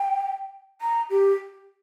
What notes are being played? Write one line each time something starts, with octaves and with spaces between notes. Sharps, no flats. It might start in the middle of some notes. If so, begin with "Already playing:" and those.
Already playing: G5
A#5
G4